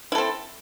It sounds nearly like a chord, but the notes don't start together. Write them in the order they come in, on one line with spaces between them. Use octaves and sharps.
E4 A4 C4